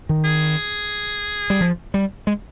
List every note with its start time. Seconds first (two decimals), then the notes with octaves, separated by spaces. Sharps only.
0.09 D#3
0.26 G#4
1.50 G3
1.61 F3
1.94 G3
2.27 G#3